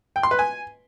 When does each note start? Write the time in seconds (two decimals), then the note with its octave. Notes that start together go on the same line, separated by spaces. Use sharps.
0.16 G5
0.23 C6
0.31 B4
0.39 G#5